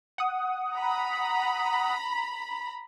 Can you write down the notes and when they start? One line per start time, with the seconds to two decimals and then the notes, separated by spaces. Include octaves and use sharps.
0.18 F#5 D#6
0.75 A#5 B5